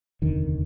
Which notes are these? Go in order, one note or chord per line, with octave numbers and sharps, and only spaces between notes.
F1 D#2 D3 D#3